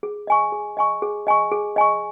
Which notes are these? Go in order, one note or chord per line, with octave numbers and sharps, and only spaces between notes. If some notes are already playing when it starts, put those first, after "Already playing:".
G#4
D#5 G#5 C#6
G#4
D#5 G#5 C#6
G#4
D#5 G#5 C#6
G#4
D#5 G#5 C#6